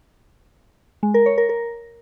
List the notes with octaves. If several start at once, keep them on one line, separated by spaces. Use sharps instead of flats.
G#3
A#4
C#5
A#4
A#4